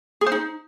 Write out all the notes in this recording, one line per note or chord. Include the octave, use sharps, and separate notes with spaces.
G#4
C5
D#4